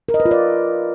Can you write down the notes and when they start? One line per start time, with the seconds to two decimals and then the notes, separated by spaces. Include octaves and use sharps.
0.09 A#4
0.14 D#5
0.20 B4
0.25 F4
0.31 D5